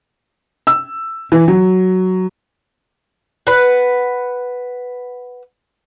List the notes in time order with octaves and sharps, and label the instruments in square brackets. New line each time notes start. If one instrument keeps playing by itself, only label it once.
[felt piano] E6
E3
F#3
[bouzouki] B4 F#5